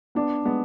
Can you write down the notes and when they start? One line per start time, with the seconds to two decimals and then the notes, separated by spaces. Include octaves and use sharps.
0.15 B3 D4
0.45 G#3 B3